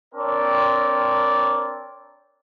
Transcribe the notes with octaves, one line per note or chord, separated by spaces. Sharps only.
C4 D4 A#4 C#5 D5